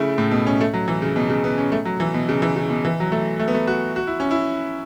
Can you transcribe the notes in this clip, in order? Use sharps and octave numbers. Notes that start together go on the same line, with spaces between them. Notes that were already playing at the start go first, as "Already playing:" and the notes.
Already playing: C#3 A3 E4
A2
B2
C#4
A3
F#3
E3
C#3
B2
C#3
B3
C#4
A3
F#3
E3
B2
C#3
E3
C#3
B2
E3
F#3
A3
A3
B3
A3
F#4
F#4
E4
C#4
E4